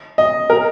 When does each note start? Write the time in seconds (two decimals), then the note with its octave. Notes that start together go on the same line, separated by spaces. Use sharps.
0.18 D#5
0.50 A#4